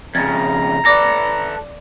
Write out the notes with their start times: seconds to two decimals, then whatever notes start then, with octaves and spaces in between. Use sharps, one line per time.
0.15 F2 C#3 A#5 G#6 A6
0.85 A4 B4 D5 D6 A#6